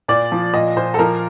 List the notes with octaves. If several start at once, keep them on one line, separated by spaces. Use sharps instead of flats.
A#2 D5
F3
A#2 D#5
A#2 C5
A4
F3 A#4